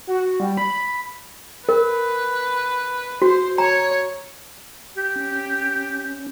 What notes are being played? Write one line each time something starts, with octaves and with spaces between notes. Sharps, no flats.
F#4
G3
B5
A#4 B4
F#4 C5
C#5 A#5
G4
C#4